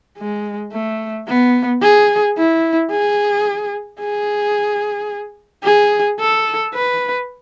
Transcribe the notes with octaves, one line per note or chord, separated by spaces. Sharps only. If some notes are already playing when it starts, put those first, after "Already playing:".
G#3
A3
B3
G#4
E4
G#4
G#4
G#4
A4
B4